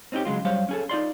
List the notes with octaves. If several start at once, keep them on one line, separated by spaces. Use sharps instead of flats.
C4 C#4 D#4 E4 G4
C#3 F#3 G#3 F4
F#2 G3 C5 C#5 F5
C#4 G#4 A4
D#4 F4 D5 C6